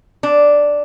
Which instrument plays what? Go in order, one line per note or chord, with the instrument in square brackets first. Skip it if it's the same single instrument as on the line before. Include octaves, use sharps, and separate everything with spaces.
[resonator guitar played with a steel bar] D4